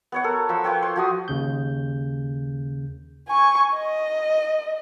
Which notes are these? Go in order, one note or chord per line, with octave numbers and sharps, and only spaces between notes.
B3 C#5 F#5
A4 A#4
F3 B5 E6
F4 B4 C#5 G5
C5
F3 F#4 D#6
D#2 C#3 G6
G#5 C#6
D#5